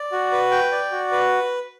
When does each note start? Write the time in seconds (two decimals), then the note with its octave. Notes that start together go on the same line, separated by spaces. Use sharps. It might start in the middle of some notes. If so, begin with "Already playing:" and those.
Already playing: D5
0.12 F#4
0.32 B4
0.51 G5
0.72 D5
0.92 F#4
1.11 B4